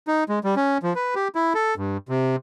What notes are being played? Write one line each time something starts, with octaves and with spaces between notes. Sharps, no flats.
D#4
G#3
G3
C#4
F3
B4
G4
E4
A4
G2
C3